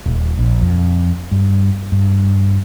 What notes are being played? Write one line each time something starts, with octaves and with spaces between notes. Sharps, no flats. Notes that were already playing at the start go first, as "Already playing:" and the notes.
D#1
A#1
F2
G2
G2